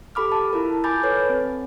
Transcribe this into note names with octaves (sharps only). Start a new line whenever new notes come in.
G4 A4 B5 D6 F6
A5
E4 F4 A#4
G#5 B5 D6 G6 A6
A4 B4 C#5
C4